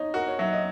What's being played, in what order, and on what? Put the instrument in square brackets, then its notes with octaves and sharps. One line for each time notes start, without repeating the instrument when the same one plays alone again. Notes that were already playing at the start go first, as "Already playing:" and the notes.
Already playing: [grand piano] D#4 [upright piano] C#5 D#5
[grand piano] F#4 [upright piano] A#4
[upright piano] C#5
[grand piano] F#3 [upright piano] E5
[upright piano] D#5